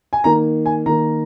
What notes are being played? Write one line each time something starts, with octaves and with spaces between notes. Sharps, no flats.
G#5
D#3 A#3 A#5
G#5
D#3 A#3 A#5